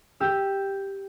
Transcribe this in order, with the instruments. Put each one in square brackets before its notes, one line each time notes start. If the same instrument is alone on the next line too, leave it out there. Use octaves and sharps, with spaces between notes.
[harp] G4 E6